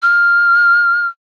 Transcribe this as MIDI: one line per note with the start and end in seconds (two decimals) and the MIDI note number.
0.02 1.07 89